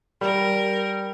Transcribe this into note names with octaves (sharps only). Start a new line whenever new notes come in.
G3 A#4